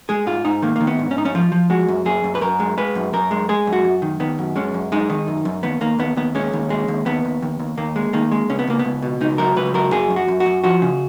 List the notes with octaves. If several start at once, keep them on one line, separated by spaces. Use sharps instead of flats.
G#3 G#4
G#2 F4
G#2 D#4
D#3 A#3
D#3 A#3
B3
G#2
C#4
G#2 D#4
C#4
F3 F4
F3
G#3 F#4
F#2
F#2 G#4
F#2
B4
F#2 A#4
G#3
G#3 B4
F#2
F#2 A#4
G#3
G#3 G#4
F#2
F#4
F#2
D#3
D#3 B3
F#2
G#3 C#4
F#2
G#3 D#4
D#3
F#2
F#2
D#2 B3
D#2 A#3
D#2 B3
D#2 B3
G#3 C#4
D#2
G#3
D#2
D#2 B3
D#2
D#2
D#2
D#2 A#3
G#3
D#3 A#3
G#3
C#2 C#4
B3
C#2 A#3
B3
C#2
B2
C#2 D#4
F#3 A#4
C#2 B4
F#3 A#4
F#2 G#4
F#2
F#4
F#2
F#4
F#2
F3 F#4
C#3